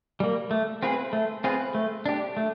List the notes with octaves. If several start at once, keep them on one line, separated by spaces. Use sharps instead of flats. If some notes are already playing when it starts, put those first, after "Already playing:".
G3 A#3
A3
C4 F4 G#4 B4
A3
C4 F4 G#4 B4
A3
D4 G4
A3